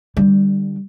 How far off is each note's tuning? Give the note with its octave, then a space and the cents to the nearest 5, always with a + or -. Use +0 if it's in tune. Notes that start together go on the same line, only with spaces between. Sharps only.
D3 +20 G3 +0